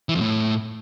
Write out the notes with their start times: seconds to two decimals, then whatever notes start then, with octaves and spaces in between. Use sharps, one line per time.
0.09 E3
0.15 F2
0.21 A2